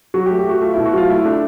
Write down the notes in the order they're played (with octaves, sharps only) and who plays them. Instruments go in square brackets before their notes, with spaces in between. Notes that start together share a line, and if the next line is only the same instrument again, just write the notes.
[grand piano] F#3 F#4
G4
A3
G4
A3 F#4
A3 F4
B2 E4
F#4
F#3 F4
A3 E4
A3 D4